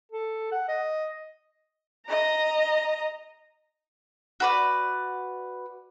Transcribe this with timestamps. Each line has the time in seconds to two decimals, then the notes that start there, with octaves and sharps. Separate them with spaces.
0.12 A4
0.52 F#5
0.68 D#5
2.07 D#5 A#5
4.40 F#4 B4 D5